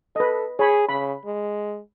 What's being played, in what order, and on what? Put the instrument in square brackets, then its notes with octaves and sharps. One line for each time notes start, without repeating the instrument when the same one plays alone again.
[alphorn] A4 [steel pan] B4 D#5
[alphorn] G#4 [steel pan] C#5 B5
[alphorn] C#3 [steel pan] B5
[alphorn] G#3